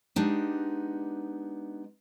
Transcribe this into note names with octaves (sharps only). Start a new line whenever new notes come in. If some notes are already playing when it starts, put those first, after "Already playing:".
G#3 B3 D4 D#4 G4